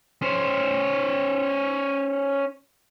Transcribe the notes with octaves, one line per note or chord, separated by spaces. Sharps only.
C#4 C5